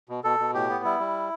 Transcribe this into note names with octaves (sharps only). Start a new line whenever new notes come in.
B2
B2 A4
B2
A2 G4
B3
G3 E4
G3